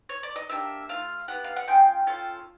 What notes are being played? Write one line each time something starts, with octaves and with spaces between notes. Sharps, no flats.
C#5
D5
D#5
A#3 D4 G4 E5
A3 D4 F4 F5
B3 E4 G4 F#5
F5
F#5
C#4 F4 G#4 G5
C#4 F4 A4